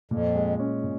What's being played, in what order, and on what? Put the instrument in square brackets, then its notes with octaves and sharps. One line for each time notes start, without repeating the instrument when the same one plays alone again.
[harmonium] F2 [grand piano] A#2
[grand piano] G#3
C#4
A#2